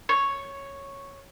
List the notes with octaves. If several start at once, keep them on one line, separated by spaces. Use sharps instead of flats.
C#5